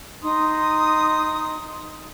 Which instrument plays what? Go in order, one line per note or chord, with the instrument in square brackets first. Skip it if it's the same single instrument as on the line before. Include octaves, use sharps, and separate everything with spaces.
[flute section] D#4 C6 D#6